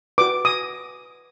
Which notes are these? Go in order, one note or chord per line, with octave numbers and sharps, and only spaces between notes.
F#4 B4 D6
D#6